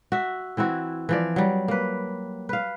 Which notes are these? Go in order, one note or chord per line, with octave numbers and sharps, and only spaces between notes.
F#4 E5
E3 C4 E4 F#4
E3 F3 D5
F#3 G3
A#3 B4
B4 F5